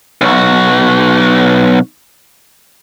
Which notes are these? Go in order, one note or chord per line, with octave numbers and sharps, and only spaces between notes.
B1 F#4